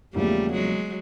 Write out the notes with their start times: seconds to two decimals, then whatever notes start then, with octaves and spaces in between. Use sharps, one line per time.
0.14 E1 E2 C#3 F3 G3 A3 A#3
0.53 F#3 G#3